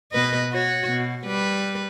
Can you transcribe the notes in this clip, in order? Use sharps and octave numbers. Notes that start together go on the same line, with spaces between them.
B2 B4 D#5
F#4 C#5
B2
G3 B4